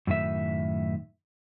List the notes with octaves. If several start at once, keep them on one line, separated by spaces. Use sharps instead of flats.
F#2 A2 D#3 E5